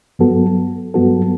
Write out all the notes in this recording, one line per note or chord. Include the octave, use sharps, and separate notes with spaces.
G2 F#3 B3 F#4 A4
G2 F#3 B3 F#4 A4